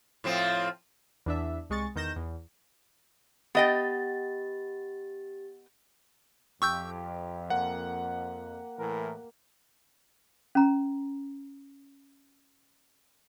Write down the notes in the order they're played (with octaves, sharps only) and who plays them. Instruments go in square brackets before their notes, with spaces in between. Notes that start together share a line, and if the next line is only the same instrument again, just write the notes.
[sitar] A2 F3 C4
[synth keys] E2 D4 E5
C2 G#3 C#6 A6
E2 D#3 G6 A#6 E7
E2
[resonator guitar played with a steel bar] B3 D#5 G5 [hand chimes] G4 A6
[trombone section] F2 [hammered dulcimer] G4 [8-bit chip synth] C#6 E6 G6
[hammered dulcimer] A#3 [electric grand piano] F#5
[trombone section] A2 E3 A#4
[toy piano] C#4 A#5